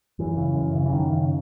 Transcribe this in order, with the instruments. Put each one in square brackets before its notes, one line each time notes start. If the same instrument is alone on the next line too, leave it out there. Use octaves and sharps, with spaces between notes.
[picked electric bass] F#2 E3
C#3
F#2
C#3
E3
F#2 D#3
C#3